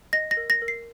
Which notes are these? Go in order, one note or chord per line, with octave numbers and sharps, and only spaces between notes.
D#5 A#6
A#6
A#4
A#6
A#4
C7